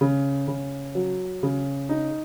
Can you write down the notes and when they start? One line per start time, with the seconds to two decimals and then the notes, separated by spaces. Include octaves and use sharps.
0.01 C#3
0.48 C#3
0.95 F#3
1.43 C#3
1.89 D#4